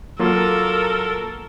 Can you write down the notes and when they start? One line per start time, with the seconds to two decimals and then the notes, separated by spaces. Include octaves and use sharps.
0.19 F#3 A#3 F4 A4 A#4